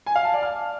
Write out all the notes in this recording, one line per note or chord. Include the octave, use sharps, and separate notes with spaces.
G#5
F5
A5
D5
F6